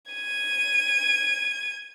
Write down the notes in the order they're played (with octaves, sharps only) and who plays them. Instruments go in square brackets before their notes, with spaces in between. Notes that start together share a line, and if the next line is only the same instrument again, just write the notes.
[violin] G#6 D#7